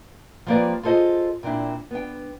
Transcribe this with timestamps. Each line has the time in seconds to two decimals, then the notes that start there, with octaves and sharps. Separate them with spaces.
0.46 F3 G3 A#3 C4 B4 D5
0.83 F4 G#4 A4 C5 D#5
1.43 A#2 C4 D4 E4
1.91 B3 D4 G5